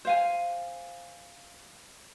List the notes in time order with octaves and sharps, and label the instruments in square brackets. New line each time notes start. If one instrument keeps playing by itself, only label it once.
[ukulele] C5 F5 G#5